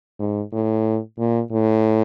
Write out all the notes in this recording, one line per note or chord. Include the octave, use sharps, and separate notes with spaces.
G#2
A2
A#2
A2